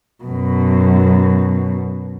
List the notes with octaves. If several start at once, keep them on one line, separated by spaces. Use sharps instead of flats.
F#2 B2